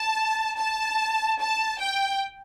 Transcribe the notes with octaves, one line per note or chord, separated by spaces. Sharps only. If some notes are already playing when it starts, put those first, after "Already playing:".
Already playing: A5
A5
A5
G5